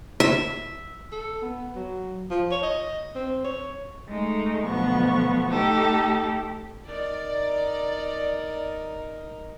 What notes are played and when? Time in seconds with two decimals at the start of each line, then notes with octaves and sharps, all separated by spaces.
0.20 E5
1.12 A4
1.42 B3
1.76 F#3
2.31 F3
2.51 C#5
2.63 D#5
3.16 C4
3.44 C#5
4.07 G#3 A3 D#4
4.65 D2 B2 F3 F#3 B3 C#6
5.49 A3 D#4 G4 A4
6.87 D#4 A#4 D5